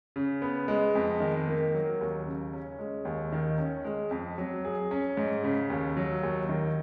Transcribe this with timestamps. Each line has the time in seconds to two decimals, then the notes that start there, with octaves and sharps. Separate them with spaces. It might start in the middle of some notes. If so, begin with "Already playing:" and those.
0.16 C#3
0.42 B3
0.68 G#3
0.95 F2
1.20 D#3
1.47 A#3
1.74 F#3
2.01 D#2
2.26 C#3
2.53 C#4
2.79 G#3
3.05 D#2
3.32 D#3
3.58 C#4
3.84 G#3
4.11 F2
4.38 F#3
4.65 G#4
4.91 C#4
5.17 G#2
5.44 C#3
5.70 D#2
5.97 F#3
6.23 D#2
6.49 D#3